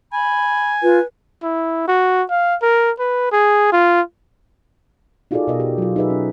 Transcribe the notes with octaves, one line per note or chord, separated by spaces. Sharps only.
G#5 B5
F4 B4
E4
F#4
F5
A#4
B4
G#4
F4
D#4 F4 F#4 G#4 A4 D5
B2 A#4 D#5
G4
F#3 F4
D#4 G#4 B4 E5
C#4